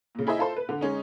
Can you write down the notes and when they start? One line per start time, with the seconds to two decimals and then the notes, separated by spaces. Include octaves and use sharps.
0.15 A#2 C#3
0.27 E4 G#4 C5 D#5 E5
0.39 F4 A4 C5
0.57 B4
0.69 D3
0.81 G#3 C#4 D#4